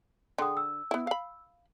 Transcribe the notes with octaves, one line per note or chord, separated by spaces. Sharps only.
D3 G#4 G5 D#6
E6
B3 E4
F5 B5